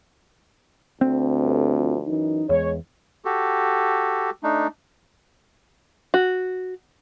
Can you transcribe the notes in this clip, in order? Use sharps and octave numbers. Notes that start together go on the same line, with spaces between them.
D2 C4
G1
G1 F3
F#2 E3 D#4
E2 G#3 C#5
F#4 G4 A4
A3 D4 D#4
F#4